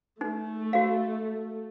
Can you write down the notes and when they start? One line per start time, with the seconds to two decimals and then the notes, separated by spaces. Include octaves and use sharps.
0.21 A3 D#4
0.73 F#4 F5